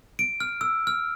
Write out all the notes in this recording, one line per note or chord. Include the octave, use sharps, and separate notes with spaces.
D7
F6
E6
F6